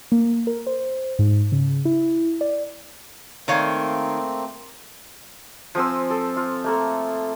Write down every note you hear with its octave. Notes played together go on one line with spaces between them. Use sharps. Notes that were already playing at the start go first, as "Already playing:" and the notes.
A#3
A#4
C5
G#2
C#3
E4
D5
D#3 A3 A#3 C4 C#5 F5
F3 C4 G#5 E6
A4
F4
A3 A#3 A4